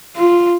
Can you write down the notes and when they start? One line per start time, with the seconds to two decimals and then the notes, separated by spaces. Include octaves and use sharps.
0.16 F4